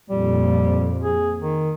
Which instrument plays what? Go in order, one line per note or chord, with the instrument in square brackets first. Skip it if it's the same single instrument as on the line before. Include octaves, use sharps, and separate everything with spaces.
[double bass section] F2 A#2 [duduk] G3
[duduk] G#4
D#3